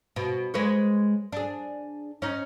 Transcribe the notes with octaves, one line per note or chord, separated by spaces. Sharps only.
B2
G#3 B4 C#5
D4 G#4
C#4 D#4